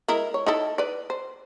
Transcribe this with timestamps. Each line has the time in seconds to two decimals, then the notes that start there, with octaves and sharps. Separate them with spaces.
0.08 G#3 E4 A#4
0.34 C#5
0.46 D#4 E4 A4
0.78 B4 D5
1.10 C5